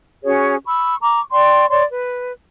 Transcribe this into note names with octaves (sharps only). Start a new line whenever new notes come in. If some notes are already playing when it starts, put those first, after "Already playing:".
C#4 F#4 G#4 C#5
B5 C#6 E6
A#5 C#6 D6
D5 G5 C6 C#6
C#5 D5 C6
B4